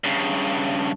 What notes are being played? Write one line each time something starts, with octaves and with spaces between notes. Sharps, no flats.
G2 C#3